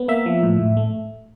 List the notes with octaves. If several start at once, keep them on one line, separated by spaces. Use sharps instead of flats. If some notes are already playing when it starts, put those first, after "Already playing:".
Already playing: B3
A#3 E5
F3
A2
A2
A3